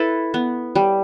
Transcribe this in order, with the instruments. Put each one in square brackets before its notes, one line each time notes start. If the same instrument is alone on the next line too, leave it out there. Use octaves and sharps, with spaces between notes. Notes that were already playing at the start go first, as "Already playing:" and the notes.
Already playing: [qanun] E4 A4 B4
B3
G3